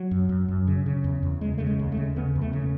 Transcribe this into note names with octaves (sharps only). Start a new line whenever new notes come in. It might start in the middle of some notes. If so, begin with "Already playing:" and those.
Already playing: F#3
F#2
F#2
F#2
C#3
C#3
E2
E2
C#3 G#3
C#3 A3
G#3
D#2
A3
C#3
C#3 B3
E2
A3
C#3